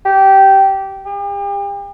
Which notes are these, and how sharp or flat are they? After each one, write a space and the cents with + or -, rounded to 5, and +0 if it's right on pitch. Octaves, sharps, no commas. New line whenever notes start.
G4 -15
G4 +40